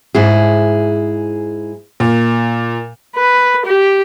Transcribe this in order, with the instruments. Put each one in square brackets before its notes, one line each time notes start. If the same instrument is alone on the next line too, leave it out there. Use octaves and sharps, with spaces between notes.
[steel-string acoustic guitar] G#2 E4 G#4
[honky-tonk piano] A#2
[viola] B4
G4